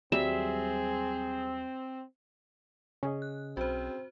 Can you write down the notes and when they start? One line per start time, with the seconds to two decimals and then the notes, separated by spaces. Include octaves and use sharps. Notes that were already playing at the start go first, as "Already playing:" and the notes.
0.12 D#2 F#3 G3 C4 G#4 E5
3.03 C#3 C#4 G#4 D#5
3.22 F#6
3.57 B1 C4 F#4 C5